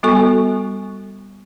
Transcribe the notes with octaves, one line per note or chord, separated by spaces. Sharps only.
G3 B3 F#4 A4 G#5 C#6